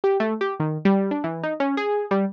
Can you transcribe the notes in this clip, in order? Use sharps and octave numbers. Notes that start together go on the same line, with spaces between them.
G4
A3
G4
D#3
G3
D4
E3
D#4
C#4
G#4
G3